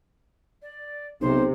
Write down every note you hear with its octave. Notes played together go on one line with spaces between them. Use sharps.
D5
B1 C3 C5